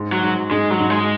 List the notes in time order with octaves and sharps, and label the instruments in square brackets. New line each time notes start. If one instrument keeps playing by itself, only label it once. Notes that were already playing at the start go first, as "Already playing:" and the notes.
Already playing: [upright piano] G#2
[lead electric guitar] F#3
[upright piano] G#2
[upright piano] G#2 [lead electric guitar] G#3
[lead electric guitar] F#3
[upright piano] G#2
[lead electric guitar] G#3